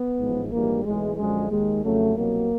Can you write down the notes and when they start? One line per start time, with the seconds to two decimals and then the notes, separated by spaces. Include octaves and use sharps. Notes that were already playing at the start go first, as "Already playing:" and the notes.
Already playing: B3
0.18 A1 G#2 F3 G#3
0.51 A#1 G#2 E3 G3 A#3
0.84 B1 A2 E3 G#3
1.16 F#2 D3 F3 G#3
1.49 D#2 D#3 G#3
1.82 F2 C#3 F#3 A3
2.15 C2 B2 F#3 A#3